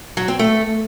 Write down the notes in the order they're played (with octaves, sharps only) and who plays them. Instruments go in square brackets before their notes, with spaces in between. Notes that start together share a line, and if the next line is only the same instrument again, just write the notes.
[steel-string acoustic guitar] F#3
C4
A3